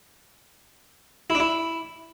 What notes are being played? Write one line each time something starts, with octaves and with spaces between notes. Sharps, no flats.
E4
D4
E4